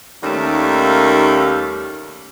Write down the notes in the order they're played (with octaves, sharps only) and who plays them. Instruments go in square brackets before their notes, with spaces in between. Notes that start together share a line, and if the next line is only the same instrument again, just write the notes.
[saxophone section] D#2 D#3 G3 A3 A#3 C#4